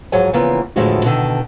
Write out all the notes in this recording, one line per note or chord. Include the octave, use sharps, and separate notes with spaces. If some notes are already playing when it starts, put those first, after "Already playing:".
G#2 F3 F#3 G#4 C#5 G#5
C#3 E3 F3 A#3 B3
E2 A2 D3 F3 G#3 F#4
B2 D3 D#3